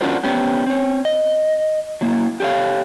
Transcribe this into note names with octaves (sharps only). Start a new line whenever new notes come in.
C#4 D4 F4 F#4 A#4 C5
B3 C#4 G4
C4 C#5
D#5
F#3 A#3 E4
G4 A4 C5 C#5 F5